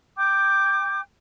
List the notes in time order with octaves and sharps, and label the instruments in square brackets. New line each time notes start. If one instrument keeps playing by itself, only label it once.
[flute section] G5 D6 G6